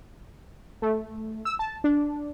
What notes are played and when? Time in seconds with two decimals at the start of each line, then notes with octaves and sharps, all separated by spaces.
0.82 A3
1.45 E6
1.59 A5
1.84 D4